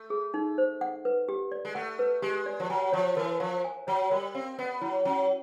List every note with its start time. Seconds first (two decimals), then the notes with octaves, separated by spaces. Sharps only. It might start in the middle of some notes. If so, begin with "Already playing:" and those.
Already playing: A3
0.10 G#4
0.34 D#4
0.58 C5
0.81 F#5
1.05 B4
1.29 G4
1.52 D5
1.65 G#3
1.75 A3 F#5
1.99 B4
2.22 G#3 G4
2.46 D5
2.60 F3
2.70 F#3 G#5
2.93 F3 C#5
3.17 E3 A#4
3.40 F3 F5
3.64 G#5
3.87 F#3 C#5
4.11 G3 A#4
4.34 C4 F5
4.58 B3 D5
4.81 F#3 E4
5.05 F#3 C#4